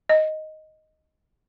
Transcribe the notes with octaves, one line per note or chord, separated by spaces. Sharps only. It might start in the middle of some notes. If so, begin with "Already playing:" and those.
D#5